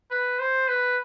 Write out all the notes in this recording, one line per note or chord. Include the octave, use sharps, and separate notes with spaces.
B4
C5
B4